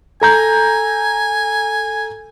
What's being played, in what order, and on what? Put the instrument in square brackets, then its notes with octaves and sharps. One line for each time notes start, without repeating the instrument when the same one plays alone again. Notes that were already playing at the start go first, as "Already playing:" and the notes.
[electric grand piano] A4 A#5 G6 [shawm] G#5